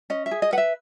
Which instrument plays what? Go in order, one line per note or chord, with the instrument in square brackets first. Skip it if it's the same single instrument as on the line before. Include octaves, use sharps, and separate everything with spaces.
[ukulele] C#4 D#5
E5
G#4
D#5
B4 F#5
E5